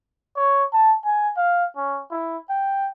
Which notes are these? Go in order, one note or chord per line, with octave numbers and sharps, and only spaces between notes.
C#5
A5
G#5
F5
C#4
E4
G5